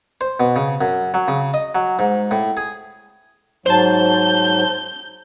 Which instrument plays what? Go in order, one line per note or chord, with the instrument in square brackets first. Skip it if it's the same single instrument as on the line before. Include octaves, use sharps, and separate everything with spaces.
[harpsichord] C5
B2
C#3
F#2
F#3
C#3
D#5
F#3
G#2
A2
G#4
[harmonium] G#2 F#3 [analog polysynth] C5 A5 [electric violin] G6